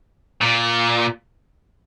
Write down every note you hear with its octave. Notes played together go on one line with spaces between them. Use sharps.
A#2